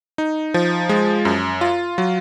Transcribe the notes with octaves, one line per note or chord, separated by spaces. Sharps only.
D#4
F3
G#3
F#2
F4
F#3